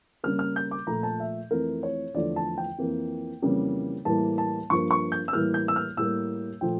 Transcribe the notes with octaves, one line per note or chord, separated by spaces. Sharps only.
C#3 G3 A#3 F6
F6
G6
D6
A#2 F3 A3 A#5
A5
E5
F2 E3 A3 A#4
C#5
E2 D3 F3 A3 D5
A5
G5
F2 E3 A#3
F2 C#3 E3 G3 A#3
A2 E3 G3 A#3 A5
A5
G2 F3 A#3 C#6
C#6
G6
E6
A2 E3 G3 A#3 F6
G6
E6
F6
A2 G3 A#3 E6
A#2 F3 A3 G5